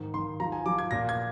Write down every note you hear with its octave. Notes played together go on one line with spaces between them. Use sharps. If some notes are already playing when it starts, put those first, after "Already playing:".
Already playing: G#2 D#3
D#3 C6
F3 A#5
G#5
F3 D6
G#6
A#2 A#6
G#6